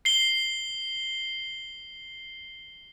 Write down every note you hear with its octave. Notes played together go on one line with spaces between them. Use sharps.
C7 G7